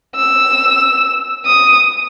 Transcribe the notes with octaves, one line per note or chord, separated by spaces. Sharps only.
E6
D#6